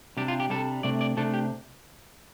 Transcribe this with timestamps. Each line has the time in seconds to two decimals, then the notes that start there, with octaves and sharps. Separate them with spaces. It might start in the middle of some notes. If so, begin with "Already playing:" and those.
0.17 C3 G3 D4 G4
0.28 F4
0.40 G4
0.50 C3 G3 D4 A4
0.83 C3 A3 D4 D5
1.01 D5
1.17 C3 A3 D4 A4
1.34 G4